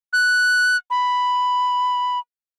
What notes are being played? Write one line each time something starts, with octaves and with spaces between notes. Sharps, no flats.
F#6
B5